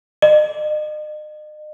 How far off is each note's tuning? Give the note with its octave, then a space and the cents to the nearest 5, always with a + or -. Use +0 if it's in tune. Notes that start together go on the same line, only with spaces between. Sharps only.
D#5 -40